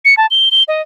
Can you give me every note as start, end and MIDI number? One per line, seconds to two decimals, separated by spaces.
0.05 0.15 97
0.17 0.26 81
0.31 0.49 103
0.51 0.63 103
0.68 0.82 75